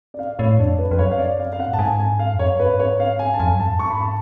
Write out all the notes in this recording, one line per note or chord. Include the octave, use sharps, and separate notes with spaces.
D5
F5
A2 C#5
F2 D4
B4
F2 B4
F#2 C#5
F5
D5
F5
F5
F#5
A2
A5
G#2 G#5
G#5
F5
F2
C#5
F#2
G#2 B4
C#5
F5
G#5
A5
F2 G#5
F#2
G#2 A5
F2
G#2 C#6
B5
A5